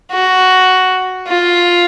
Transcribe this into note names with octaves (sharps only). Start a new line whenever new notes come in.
F#4
F4